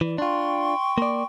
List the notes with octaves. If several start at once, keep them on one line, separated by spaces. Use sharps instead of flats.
E3 D5
D4 F4 G5 C6 C#6
A#3 D5